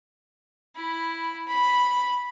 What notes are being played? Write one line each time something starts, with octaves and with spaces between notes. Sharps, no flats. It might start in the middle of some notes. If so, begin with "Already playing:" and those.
E4 B5
B5